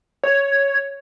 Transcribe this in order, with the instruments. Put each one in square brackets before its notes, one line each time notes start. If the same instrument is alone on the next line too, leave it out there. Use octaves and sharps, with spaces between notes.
[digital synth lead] C#5